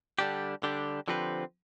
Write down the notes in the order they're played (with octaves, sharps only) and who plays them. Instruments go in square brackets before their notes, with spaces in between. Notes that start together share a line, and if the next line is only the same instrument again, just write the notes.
[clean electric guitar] D3 G3 D4 G4
D3 G3 D4 G4
D3 F3 C4 G4 B4